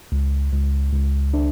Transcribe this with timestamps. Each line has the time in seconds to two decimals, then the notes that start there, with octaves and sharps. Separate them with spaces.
0.12 C#2
0.52 C#2
0.93 C#2
1.34 D4